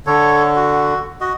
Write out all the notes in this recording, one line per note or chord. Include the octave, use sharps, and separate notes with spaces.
D3 A4 C#5
F#4
F#4 D#5